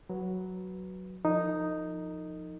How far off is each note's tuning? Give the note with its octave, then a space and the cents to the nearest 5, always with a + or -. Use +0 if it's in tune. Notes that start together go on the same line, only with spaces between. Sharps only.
F#3 +0 B4 +0
F3 +0 D#4 +0 A#4 -45